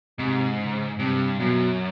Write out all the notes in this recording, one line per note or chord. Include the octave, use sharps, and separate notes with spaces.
G#2 C3
C#3
G2 C3
F#2 B2